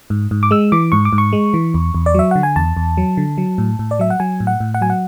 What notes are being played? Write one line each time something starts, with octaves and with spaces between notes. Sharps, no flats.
G#2
G#2
D6
G#3 E6
E3 D6
G#2 C#6
D6
G#2
C#6
G#3
E3
E2
E2
D5
F#3 E5
D3 F#5
G#5
E2 A5
E2
F#3
D3
F#3
A2
A2
D5
F#3 E5
F#5
F#3 G#5
A2
F#5
A2
F#5
F#3 G#5
F#5